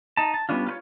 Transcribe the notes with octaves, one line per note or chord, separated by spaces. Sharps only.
D#4 A5
A5
G3 B3 C#4 D4 F4
F4 B4 C#5